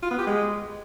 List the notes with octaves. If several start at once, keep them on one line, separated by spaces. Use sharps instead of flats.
F4
B3
G4
G#3